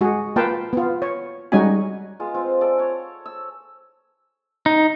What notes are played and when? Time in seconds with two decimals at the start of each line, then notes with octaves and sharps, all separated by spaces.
0.01 G#3 F#4 G#4
0.36 A#3 F4 B4 F5 G5 A5
0.73 B3 F4
1.02 C#5
1.52 G3 G#3 C#4 D#4 F#4 G#5
2.20 G#3 B3 F4
2.34 C4 F4
2.61 A4 D5
2.79 C#5 F#5
3.26 E6
4.66 D#4